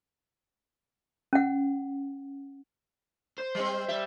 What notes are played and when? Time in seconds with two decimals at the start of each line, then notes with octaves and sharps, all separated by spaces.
1.33 C#4 F#5
3.38 C5
3.55 G3 C4
3.89 G3 E5